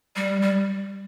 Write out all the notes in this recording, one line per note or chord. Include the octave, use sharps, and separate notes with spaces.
G3
G3